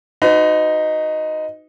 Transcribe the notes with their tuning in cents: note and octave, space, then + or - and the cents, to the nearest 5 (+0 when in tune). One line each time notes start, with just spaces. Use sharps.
D#4 +0 F#4 -10 B4 +40